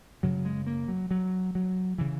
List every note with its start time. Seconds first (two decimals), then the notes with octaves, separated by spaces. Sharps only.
0.23 F#2 C#3 F#3
0.45 G#3
0.67 A#3
0.88 F#3
1.11 F#3
1.55 F#3
1.98 C#3 E3